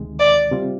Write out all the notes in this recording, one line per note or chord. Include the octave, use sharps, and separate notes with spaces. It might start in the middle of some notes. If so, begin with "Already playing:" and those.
Already playing: D2 C3 D#3 G#3
D5
C3 G3 C4 F4